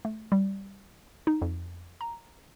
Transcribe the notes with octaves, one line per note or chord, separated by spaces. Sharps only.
A3
G3
D#4
F2
A#5